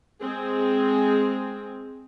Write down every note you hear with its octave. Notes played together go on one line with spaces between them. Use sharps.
G#3 C4 G#4